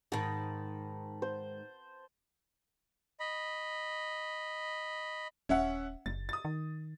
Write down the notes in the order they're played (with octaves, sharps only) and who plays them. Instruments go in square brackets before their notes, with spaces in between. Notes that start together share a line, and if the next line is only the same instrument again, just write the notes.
[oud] G#2 D#3 [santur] A5 B5
[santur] C5
[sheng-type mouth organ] D#5 B5
[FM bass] D#1 [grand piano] C#4 E5 F#5
[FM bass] F#1 [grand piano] A6
[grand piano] D#6 A6
[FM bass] D#3